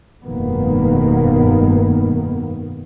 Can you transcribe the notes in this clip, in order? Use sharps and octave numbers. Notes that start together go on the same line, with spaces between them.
F1 G2 B2 D#3 A#3 B3